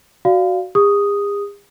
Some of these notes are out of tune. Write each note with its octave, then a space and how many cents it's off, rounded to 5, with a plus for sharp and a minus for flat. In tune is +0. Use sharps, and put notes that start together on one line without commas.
F#4 +0 D5 +0 F5 -5
G#4 -45 D#6 +0